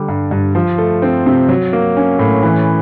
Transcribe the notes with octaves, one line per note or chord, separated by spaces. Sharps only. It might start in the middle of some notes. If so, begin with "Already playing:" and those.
Already playing: D3 G3
G2
G2
F3
A3
C4
C3
F#3
A#3
C#4
A2
E3